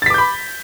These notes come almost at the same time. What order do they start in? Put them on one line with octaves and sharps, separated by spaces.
A6 B6 D6 G6 B5